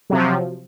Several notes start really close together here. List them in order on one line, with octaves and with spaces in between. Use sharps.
F#3 C3 F3